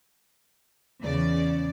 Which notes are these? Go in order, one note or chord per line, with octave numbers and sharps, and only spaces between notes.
E2 C#3 D5